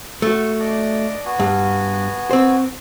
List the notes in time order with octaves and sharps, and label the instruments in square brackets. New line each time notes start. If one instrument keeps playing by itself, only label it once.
[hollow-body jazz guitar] A3 F#4
[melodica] D4 D5 D#5
B3 F#4 G#5
[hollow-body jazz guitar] G2
C4 C5